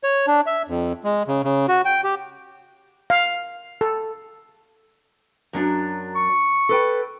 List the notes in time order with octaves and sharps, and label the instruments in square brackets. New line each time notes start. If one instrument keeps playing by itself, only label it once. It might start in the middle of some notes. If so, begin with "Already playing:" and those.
[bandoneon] C#5
D4
E5
F2
G#3
C#3
C#3
F#4
G5
G4
[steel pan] F5
A4
[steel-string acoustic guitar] F#2 F#3 D4
[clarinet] C#6
[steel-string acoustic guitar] A4 B4 G5